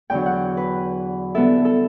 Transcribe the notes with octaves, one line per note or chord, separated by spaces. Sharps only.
E2 D3 F#3 G5
F#5
B4
D3 G3 B3 E4 A4
A4